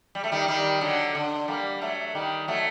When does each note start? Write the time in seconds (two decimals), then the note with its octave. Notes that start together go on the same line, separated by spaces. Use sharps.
0.15 G3
0.24 A3
0.32 D#3 G3
0.48 D#3 G3
0.81 D3 F#3
1.15 D3
1.48 G3 A#3
1.82 F#3 A3
2.15 D#3 G3
2.48 F#3 A3